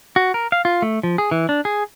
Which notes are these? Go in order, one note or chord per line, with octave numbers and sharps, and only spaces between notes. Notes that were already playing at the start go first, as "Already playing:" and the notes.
F#4
A#4
F5
F4
A3
F3
G#4
E3
D4
G#4